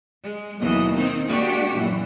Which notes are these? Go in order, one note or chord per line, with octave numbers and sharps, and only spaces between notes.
G#3
D#2 B2 E3 F#3 D#5
D#3 C4 D#4
G#3 A#3 D4 F#4 G4
F#2 A#2 E3